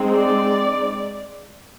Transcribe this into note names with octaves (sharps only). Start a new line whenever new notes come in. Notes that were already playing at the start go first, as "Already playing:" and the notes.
Already playing: G#3 C4 D#4
D5